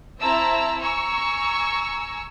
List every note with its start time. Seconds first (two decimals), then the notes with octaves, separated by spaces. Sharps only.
0.21 C4 E4 E5 A5 A#5 E6
0.80 G#5 A#5 C#6 E6